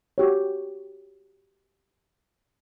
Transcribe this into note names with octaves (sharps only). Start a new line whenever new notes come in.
F#4 G4 C#5